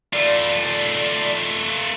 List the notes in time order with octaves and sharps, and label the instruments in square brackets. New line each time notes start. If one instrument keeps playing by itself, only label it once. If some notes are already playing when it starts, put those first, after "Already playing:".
[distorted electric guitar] A3 F4 [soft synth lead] D5